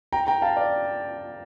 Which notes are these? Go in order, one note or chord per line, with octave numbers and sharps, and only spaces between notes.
G5 A#5
G5 A#5
F5 A5
D5 F5